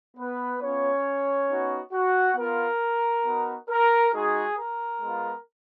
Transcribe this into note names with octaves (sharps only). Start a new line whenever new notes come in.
B3 B4
B3 C#4 F4 C#5
B3 D#4 F#4
F#4 F#5
B3 F4 A#4
B3 D#4 F#4
A#4
G#3 D#4 F#4 G#4
A#4
G#3 B3 F4